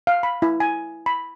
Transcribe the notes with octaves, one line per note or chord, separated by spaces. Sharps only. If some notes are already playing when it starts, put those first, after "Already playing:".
F5
B5
E4
G#5
B5